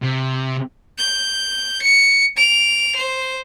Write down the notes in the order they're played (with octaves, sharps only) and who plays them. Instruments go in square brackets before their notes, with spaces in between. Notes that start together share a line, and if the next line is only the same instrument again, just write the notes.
[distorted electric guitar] C3
[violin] G6
C#7
D7 F7
C5